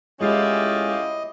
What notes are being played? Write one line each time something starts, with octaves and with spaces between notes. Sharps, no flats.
A2 G#3 C#4 E4 F4 G4 D#5